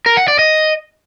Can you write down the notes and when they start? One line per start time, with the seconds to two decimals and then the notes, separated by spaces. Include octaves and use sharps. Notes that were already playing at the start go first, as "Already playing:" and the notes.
0.06 A#4
0.17 F#5
0.28 D5
0.39 D#5